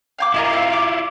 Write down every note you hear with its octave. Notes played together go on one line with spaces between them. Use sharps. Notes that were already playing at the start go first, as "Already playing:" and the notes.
F5 G5 D6
E4 F4 A#4 D#5 G#5
C4 F5
D5 D6